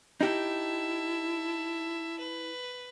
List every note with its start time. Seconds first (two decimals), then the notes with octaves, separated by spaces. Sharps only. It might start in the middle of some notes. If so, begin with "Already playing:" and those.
0.21 D#4 E4 G4 E5 A5
2.19 B4